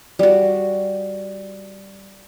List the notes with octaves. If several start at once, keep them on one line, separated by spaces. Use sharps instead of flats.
G3 F#4